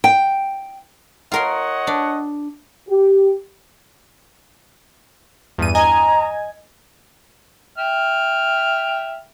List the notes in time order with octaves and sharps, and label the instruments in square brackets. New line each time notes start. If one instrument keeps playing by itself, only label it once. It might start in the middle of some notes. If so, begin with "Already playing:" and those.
[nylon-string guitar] G5
[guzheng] F4 A#4 C6 [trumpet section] C#5 D#5 F#5
[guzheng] D4
[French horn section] G4
[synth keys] E2 G2 D#7
[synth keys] D#5 G#5 [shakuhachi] A#5
[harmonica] E5 G5 F6